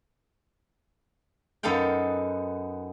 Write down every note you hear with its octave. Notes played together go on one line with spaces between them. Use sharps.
F#2 B3 D#4 A4 F5 G5